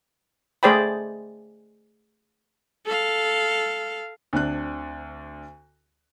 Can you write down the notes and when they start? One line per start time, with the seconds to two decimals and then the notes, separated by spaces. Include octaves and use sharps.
0.63 A3 G#4 C5 D5 G5 B5
2.86 A4 F5
4.33 D2 C4 D4 F#6